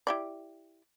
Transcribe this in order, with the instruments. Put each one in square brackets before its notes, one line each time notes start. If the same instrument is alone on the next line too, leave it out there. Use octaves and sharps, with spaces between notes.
[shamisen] E4 G4 D5